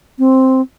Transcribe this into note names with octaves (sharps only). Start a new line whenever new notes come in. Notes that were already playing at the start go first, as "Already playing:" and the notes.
C4